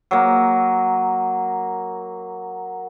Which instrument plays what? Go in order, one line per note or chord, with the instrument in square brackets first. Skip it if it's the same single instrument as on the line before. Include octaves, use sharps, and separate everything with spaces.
[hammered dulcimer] F#3 A#3